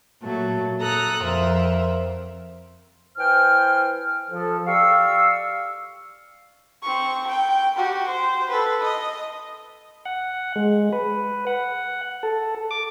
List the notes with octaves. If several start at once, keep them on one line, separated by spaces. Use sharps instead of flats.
A#2 F#3 A3
A4 A#5 D#6 F#6
F2 A#4 C5 E5
E3 C5 G5 G#5 F6
F3 A4
G4 D5 F5 C#6 E6
C4 C#6
G5
F#4 G4
C5
A4 B4
D#5
F#5
G#3
B4
F#5
A4
D6